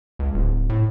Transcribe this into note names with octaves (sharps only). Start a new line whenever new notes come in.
C#2
D1
A2